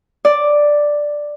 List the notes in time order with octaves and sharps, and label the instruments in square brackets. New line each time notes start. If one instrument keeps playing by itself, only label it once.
[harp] D5